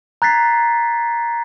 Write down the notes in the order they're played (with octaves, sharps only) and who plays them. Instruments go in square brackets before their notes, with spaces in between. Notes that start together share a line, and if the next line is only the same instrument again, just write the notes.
[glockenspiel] A#5 F#6 G#6 A6 B6 C7